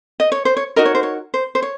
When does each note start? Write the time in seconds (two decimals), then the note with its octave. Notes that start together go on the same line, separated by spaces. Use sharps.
0.20 D#5
0.32 C#5
0.45 C5
0.57 C#5
0.76 D#4 F#4 A#4 D#5
0.85 C#5
0.95 C5
1.03 C#5
1.34 C5
1.55 C5
1.62 C#5